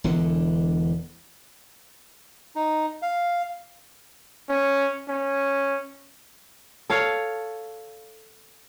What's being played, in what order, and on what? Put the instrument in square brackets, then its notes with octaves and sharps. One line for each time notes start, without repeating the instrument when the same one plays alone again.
[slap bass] E1 E2 D3
[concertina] D#4
F5
[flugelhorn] C#4
C#4
[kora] A4 C#5 F5